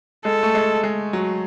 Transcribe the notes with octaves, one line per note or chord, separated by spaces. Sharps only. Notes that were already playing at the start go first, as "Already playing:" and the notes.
G#3 A4
A3
G#3
G#3
F#3